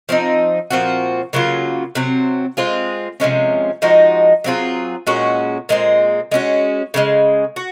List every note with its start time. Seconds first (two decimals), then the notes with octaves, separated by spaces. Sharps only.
0.09 F3 C4 D#4
0.70 A#2 F3 C4 F#4
1.33 C#3 F#3 A#3 F4
1.95 C3 F#3 C4
2.57 G#3 C4 F4 G#4
3.20 C3 F3 G#3 C#4
3.82 F3 G#3 D#4 F#4
4.44 F#3 C4 F4 G#4
5.07 A#2 G#3 C#4 F#4
5.69 A#2 G#3 C4
6.32 G#3 C#4 F#4
6.94 C#3 F3 G#3
7.56 F#4